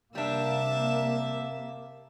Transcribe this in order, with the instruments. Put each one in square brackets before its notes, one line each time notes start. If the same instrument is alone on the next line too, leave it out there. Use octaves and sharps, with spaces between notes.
[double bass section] C3 A#3 [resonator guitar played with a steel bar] G3 D4 [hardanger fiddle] E5 A5